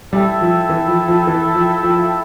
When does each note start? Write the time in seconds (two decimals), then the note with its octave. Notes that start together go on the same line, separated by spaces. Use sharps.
0.12 G3 E4 A4 E5 G5
0.41 F3
0.69 E3
0.88 F3
1.08 F3
1.27 E3
1.55 F3
1.83 F3